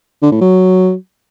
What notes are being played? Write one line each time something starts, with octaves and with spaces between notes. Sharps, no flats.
D3
A2
F#3